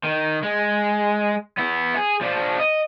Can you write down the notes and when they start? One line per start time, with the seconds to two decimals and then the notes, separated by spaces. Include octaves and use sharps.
0.04 D#3
0.43 G#3
1.58 B3 E4
1.96 G#4
2.21 F3 D4
2.59 D#5